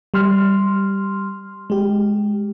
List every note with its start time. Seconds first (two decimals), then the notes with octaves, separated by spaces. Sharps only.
0.14 G3 C6 F6
1.70 G#3 G4